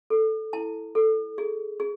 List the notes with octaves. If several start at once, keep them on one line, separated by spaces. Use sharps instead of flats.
A4
E4 A5
A4
G#4
G#4